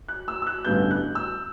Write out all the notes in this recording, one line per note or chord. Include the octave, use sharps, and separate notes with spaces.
F#6
E6
E6
F#6
A1 G2 D3 G3 B3 G6
F#6
E6